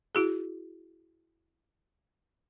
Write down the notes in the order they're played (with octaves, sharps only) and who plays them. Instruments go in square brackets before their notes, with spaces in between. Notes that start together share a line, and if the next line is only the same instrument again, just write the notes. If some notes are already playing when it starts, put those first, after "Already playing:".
[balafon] E4 F#4 G#4